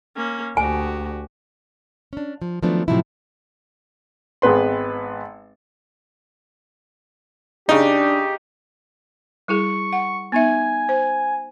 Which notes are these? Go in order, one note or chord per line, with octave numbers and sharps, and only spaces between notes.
A#3 C#4
D2 F#4 G4 G#5
C#4 D4
F3
D#3 F3 F#3 A3 B3 D4
A2 C3 F3 F#3 D#4 E4
G#1 G#3 B3 B4 C6
C#3 D4 D#4 G4
G3 E4 G#4 C#6
F#5
B3 D#4 E5 G#5
C5